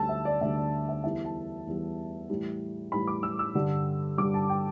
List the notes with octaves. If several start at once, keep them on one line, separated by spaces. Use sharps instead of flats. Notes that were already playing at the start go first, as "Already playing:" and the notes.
Already playing: D2 D3 G3 A5 E6
E5
D5
D2 D3 G3 E5
D5
E5
E2 E3 G3 E5
A5
E2 E3 G3
A2 E3 G3
A2 E3 G3 B5
D6
E6
E6
G2 D3 G3
G2 D3 G3 D6
A5
G5